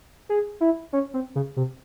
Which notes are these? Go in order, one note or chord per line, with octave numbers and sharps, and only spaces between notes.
G#4
E4
C#4
C4
C#3
C3